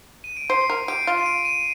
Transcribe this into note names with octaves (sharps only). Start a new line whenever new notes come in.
D#7
D7
C5 C7
A#4
G4 D7
F4
D#7
D7
D#7